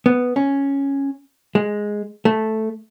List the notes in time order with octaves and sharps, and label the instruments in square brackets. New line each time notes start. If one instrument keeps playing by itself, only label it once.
[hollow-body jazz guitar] B3
C#4
G#3
A3